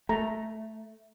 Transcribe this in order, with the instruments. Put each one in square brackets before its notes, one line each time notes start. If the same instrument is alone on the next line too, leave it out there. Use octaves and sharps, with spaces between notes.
[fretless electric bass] A3 [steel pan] A#5